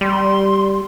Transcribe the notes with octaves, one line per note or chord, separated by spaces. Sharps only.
G3 C6